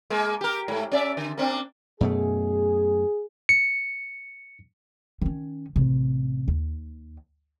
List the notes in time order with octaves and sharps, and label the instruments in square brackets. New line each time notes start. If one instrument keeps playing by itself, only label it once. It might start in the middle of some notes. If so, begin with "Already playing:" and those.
[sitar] G#3 A#3
G4 A#4
G#2 A3
C#4 D5 E5
D3
A#3 C4 D4
[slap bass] F#2 B2 A3 [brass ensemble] G#4
[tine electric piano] C#7
[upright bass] D#3 C#4
A1 C3
D#2